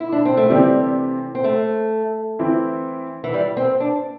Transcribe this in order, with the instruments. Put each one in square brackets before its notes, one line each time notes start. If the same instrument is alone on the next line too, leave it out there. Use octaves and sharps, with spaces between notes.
[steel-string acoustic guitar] E4
D4
C4
A3
[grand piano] C3 E3 C4 G4 [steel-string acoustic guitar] G3
[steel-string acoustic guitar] C4
A3
[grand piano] E3 C4 E4
[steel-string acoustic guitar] E3
G3
C4
D4